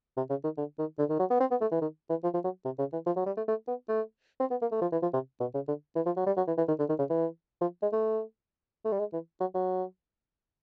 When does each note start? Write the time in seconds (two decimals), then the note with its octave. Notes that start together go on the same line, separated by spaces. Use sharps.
0.17 C3
0.30 C#3
0.44 D#3
0.58 D3
0.79 D#3
0.99 D3
1.10 D#3
1.19 F#3
1.30 B3
1.40 C4
1.51 B3
1.61 A3
1.72 E3
1.82 D#3
2.10 E3
2.24 F3
2.34 F3
2.44 F#3
2.65 C3
2.79 C#3
2.93 E3
3.06 F3
3.16 F#3
3.26 G3
3.37 A3
3.48 A3
3.68 B3
3.89 A3
4.40 C4
4.51 B3
4.62 A#3
4.72 A3
4.81 F3
4.92 E3
5.02 F3
5.13 C3
5.40 B2
5.54 C#3
5.68 D3
5.96 E3
6.06 F3
6.17 F#3
6.26 G3
6.37 F#3
6.47 E3
6.58 E3
6.68 D#3
6.79 D3
6.89 D#3
6.99 C#3
7.10 E3
7.61 F3
7.83 G#3
7.93 A3
8.85 A3
8.92 G3
8.99 G#3
9.13 E3
9.40 F#3
9.55 F#3